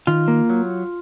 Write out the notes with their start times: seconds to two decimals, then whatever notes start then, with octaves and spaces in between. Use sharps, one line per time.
0.07 D#3 F4
0.28 A#3
0.50 F#3